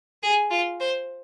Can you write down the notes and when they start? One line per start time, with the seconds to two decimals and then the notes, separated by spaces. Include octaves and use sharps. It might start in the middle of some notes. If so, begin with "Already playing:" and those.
0.23 G#4
0.51 F4
0.81 C5